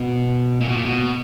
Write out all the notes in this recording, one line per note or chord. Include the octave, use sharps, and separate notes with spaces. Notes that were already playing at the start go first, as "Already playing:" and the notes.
Already playing: B2
A#2
B2
A#2
B2